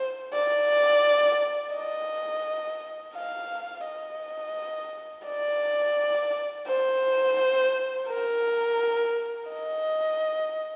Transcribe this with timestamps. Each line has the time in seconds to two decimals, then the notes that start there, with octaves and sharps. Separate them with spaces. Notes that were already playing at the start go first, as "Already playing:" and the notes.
Already playing: C5
0.33 D5
1.75 D#5
3.15 F5
3.86 D#5
5.26 D5
6.67 C5
8.08 A#4
9.49 D#5